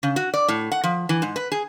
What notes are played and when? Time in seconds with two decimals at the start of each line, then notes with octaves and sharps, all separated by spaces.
0.03 C#3
0.16 F#4
0.34 D5
0.48 A2
0.72 F#5
0.84 F3
1.09 E3
1.22 G#2
1.36 B4
1.52 G#4